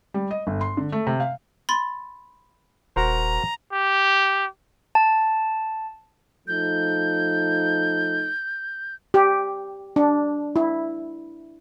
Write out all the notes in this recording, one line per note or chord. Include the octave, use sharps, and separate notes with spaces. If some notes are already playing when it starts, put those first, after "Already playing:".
G3
D#5
G1
C6
D3
A3
C3
F5
B5 C6 A6
D#1 F#4 A#4 C5 A#5
G4
A5
F3 A3 D#4 G6
G4
D4
E4